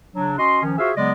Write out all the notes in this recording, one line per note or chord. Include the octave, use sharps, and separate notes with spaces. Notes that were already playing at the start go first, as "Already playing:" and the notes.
C#3 F#3 D4
C#4 F#4 D#5 C6
D#3 F3 C#4
F4 F#4 G#4 C5 E5
C#3 F#3 G#3 B3 D5 D#5